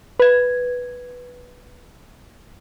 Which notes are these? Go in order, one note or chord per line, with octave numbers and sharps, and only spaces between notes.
B4 G#6